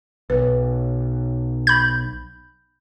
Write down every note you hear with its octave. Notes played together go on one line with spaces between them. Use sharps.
B1 B4
B5 G6